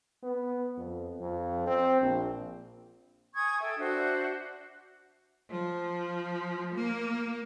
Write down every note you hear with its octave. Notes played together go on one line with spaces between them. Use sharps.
B3
F2
F2
C4
A#1
G#5 C#6 D#6 G#6
A4 E5 G5
D4 F#4 C5 E5
F3
A#3